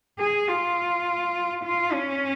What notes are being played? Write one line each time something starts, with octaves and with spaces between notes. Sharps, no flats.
G#4
F4
F4
C#4